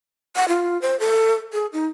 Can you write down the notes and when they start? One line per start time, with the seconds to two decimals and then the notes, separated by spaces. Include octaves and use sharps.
0.36 F#5
0.48 F4
0.82 C5
1.00 A4
1.53 G#4
1.73 D#4